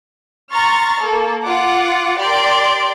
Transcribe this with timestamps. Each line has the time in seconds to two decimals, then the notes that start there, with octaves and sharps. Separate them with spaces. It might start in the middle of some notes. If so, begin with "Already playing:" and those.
0.53 A#5 C6 C#6 F6 A6
1.02 A#3 A4
1.44 F4 F#5 D6
2.19 G4 A#4 D5 C6 D7